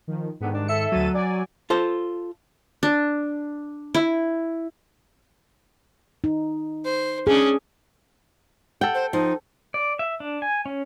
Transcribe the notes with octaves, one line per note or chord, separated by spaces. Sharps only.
D#3 F3
G#2 D3 D#3 B3
G3 D4
A4 E5 C#7
D2 F#3 A6 D#7
D5 G#5
F4 A4 C5
D4
E4
D#4
C5
C#4 D4 G#4
A4 F#5 G5
C5
F3 D#4
D5
E5
D4
G#5
C#4